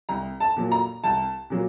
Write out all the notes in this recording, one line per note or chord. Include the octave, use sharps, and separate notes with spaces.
C2 A#5
A5
A#2 F#3 A#3
A#5
C2 A5
A#2 F#3 A#3